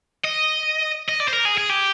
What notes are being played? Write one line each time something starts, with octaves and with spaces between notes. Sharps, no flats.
D#5
D#5
D5
C5
A#4
G#4
G#4
G4